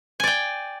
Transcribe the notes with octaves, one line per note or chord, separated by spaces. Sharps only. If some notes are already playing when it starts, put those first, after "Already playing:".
D5 G5 G#5